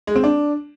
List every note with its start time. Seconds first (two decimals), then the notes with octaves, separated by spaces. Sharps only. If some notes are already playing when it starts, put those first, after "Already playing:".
0.07 G#3
0.15 C4
0.24 D4